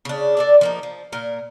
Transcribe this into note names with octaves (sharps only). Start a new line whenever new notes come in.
C#3 D4
D4 A4 D5
F3 A#3 D#4
F3
A#2 A#4